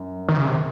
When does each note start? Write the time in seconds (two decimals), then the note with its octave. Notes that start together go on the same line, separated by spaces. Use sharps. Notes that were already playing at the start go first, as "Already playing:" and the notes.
Already playing: F#2
0.28 D#3
0.37 C#3
0.47 C3